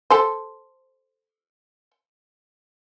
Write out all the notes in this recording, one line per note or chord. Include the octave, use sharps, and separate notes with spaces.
A4 C5